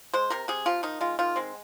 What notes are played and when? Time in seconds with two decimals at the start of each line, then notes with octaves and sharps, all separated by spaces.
0.14 G#3 C5
0.30 C3 A#4
0.48 C3 G#4
0.66 F3 F4
0.83 D#3 D#4
1.01 G#3 F4
1.19 D#3 F4
1.36 G#3 C4